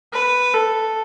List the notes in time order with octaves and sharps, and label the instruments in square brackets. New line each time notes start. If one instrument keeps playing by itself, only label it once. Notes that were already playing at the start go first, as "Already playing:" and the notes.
[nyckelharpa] B4
A4